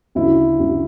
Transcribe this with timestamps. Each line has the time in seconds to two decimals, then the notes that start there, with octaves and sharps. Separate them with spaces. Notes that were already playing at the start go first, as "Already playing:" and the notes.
0.15 D2 C#3 F#3 E4
0.60 D2 C#3 F#3